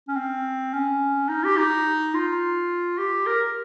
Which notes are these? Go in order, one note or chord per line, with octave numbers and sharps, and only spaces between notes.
C#4
C4
C#4
D#4
G4
D#4
F4
G4
A#4